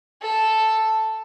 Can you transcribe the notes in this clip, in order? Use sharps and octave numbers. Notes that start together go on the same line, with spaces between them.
A4